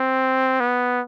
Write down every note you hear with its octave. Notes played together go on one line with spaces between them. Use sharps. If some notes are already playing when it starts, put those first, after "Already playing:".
Already playing: C4
B3